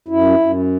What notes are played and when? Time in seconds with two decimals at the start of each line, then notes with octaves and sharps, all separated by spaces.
0.08 F#2 E4
0.39 F#2